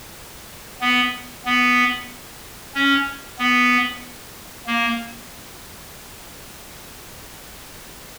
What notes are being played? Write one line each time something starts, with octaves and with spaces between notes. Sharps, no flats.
B3
B3
C#4
B3
A#3